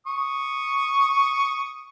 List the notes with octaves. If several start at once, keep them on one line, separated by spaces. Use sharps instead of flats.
C#6 D#6